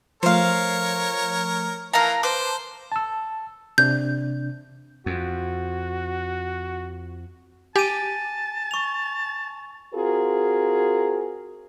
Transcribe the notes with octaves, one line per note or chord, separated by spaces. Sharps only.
F3 A3 A#4 C5 C#5 F5
E3 A#4 F5 A5 A#5
B4 C5 D6
A5 E6
C3 D4 G6
F2 F#4
G4 G#5 A5 D#7
C#6 F7
C4 F4 F#4 G#4 A#4